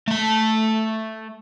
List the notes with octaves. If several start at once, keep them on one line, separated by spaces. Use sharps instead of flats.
A3 A5